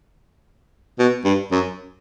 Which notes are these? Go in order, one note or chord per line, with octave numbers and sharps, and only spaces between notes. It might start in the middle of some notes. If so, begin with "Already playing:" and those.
B2
G2
F#2